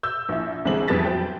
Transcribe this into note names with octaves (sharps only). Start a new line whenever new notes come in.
E6 G6
A#1 E4
C2 D3 E3 G#3 C4 F#7
F2 G3 B4 A5 A6 B6
F#3 C5 G5